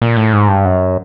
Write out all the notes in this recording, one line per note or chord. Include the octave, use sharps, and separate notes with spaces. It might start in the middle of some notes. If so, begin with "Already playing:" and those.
A#2
A2
G#2
G2
F#2